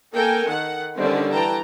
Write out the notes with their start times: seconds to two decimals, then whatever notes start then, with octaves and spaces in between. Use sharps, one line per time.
0.13 A#3 A4 A#4 G5 G#5
0.47 D#3 F#5
0.97 D3 D#3 G3 C#4 C5 D5
1.31 E3 G5 A5 A#5